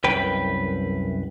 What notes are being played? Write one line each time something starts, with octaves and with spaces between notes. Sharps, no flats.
C2 F#2 B4 G5